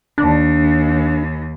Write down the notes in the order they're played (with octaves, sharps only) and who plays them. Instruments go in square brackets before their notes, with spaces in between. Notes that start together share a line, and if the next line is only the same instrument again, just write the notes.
[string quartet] D#2 [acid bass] D4